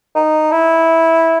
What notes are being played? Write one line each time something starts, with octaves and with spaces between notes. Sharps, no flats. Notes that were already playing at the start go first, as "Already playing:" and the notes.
D#4
E4